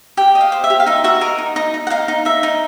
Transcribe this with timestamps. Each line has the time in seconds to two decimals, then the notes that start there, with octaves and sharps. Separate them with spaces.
0.17 G4 G5
0.35 D#5
0.41 F5
0.52 C5
0.64 E5
0.70 G4
0.80 F5
0.86 D#4 E5
1.04 F#4 E5
1.21 A#4 D#5
1.38 D#4
1.56 D#4 D#5
1.74 D#4
1.87 F#5
1.90 D#4 F5
2.08 D#4
2.25 D#4 E5
2.43 D#4